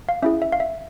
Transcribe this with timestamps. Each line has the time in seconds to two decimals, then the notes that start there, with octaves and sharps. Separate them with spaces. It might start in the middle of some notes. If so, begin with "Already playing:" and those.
0.09 F5
0.22 C#4 E4 G#4 E5
0.42 E5
0.52 F5
0.60 E5